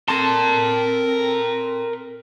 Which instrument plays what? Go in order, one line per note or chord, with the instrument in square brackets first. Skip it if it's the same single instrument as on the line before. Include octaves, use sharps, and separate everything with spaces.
[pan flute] C4 [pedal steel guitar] A4 A5 [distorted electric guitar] A#4 C6